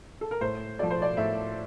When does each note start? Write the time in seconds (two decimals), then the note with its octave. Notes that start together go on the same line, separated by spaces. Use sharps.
0.21 A4
0.31 A#4
0.41 A2 C5
0.79 F3 A3 D5
0.91 C5
1.02 D5
1.17 A2 E5